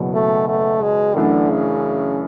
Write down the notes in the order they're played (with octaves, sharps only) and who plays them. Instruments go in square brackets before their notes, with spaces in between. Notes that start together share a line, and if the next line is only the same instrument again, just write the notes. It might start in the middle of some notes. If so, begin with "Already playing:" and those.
Already playing: [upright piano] F#1 E2 B2 F#3
[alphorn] A3
A3
G#3
[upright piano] F#2 E3 A3 D4 [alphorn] D3
[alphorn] C#3